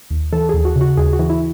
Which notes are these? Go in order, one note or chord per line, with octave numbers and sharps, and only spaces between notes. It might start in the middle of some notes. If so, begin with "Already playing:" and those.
D#2
E3 A4
D#2 G#4
F#4
C#3
F#4
D#2 G#4
F#4
E3
E4